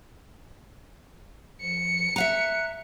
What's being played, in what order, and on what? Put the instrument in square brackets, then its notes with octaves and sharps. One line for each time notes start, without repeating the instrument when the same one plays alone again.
[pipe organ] F3 [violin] C#7
[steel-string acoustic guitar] E5 F5 A#5 [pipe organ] F#6